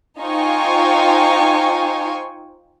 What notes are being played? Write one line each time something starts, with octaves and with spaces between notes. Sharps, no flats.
D#4 F4 C5 G5 G#5 C#6